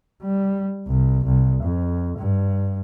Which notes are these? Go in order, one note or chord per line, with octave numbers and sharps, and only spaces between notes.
G3
C2
C2
F2
G2